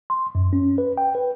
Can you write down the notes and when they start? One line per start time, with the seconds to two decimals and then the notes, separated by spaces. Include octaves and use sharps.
0.10 C6
0.35 F#2
0.53 C#4
0.78 B4
0.98 G5
1.15 B4